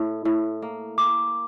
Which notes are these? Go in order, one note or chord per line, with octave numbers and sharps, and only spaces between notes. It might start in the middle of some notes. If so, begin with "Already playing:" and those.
Already playing: A2
A2
A#3
A#3 D6